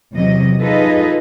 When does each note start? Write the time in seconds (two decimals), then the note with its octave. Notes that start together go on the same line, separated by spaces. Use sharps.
0.14 E2 C3 F#3 D#5
0.62 D#4 F4 G#4 A4 B4 D#5